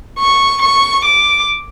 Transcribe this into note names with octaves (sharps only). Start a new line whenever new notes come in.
C#6
C#6
D6